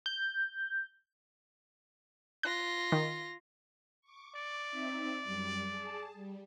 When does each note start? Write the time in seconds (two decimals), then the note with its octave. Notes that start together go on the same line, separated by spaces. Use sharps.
0.06 G6
2.43 F4 F#6 A#6
2.92 D#3
4.02 C#6 D6
4.36 D5
4.68 C4 D#4 E5
5.24 F#2 G3
5.69 G#4 A5
6.14 G3